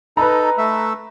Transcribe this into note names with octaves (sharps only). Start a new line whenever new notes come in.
D#4 A4 B4 A#5
A3 E5